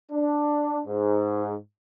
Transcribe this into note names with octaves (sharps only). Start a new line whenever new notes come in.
D4
G#2